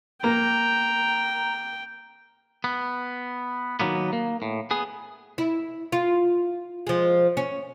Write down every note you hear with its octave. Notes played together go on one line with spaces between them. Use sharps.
A#3 G5 A#5
B3
D#3 F3 F#3 A#3 B3
A#3
A2
B3 G#4
E4
F4
F3 G#3
C#4